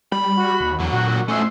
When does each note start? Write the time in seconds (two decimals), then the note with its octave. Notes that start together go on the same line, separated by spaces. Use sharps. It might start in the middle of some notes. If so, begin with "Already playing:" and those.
0.12 G3 B5
0.38 F#4
0.61 D#2
0.80 E2 D3 F#3
0.93 A#2 F#4
1.28 F2 A3 C#4 D#4 E5 C6